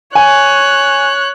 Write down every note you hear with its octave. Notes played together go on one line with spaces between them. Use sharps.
C#5 G#5 F#6